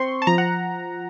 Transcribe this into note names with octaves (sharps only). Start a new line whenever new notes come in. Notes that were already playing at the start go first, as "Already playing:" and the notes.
Already playing: C4 C6 C#6
A5
F3 A#5
F#5